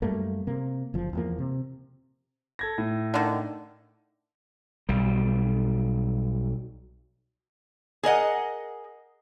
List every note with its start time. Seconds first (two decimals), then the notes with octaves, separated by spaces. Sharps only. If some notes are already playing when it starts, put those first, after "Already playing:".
0.02 F#2 G3 A3 A#3
0.47 C3 A#3
0.94 F#1 F3
1.13 E2 F3 A#3
1.39 C3
2.59 A4 G#6 A#6
2.78 A2
3.14 D3 D#3
4.89 B1 G3
8.03 G#4 A#4 D#5 F#5